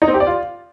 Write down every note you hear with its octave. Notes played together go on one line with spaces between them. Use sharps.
D#4
C4
G4
D5
F4